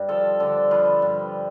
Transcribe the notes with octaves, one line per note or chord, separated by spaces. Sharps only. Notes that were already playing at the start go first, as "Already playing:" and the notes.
Already playing: G2
F3 A4
D3 A4
F3 B4
G2